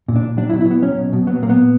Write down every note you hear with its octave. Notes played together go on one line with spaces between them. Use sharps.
A#2
D4
A#2
F#3 D4
E4
B2
E4
B2 B3
F#3 C#4
B2
B2
F#3 B3
A#2 A#3
B3
A#2